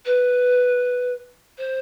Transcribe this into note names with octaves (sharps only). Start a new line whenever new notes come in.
B4
C5